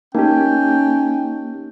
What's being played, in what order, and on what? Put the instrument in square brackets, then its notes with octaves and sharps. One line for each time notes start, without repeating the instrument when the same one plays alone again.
[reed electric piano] A#3 G4 [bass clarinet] C#4 [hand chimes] D#4 [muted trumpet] G5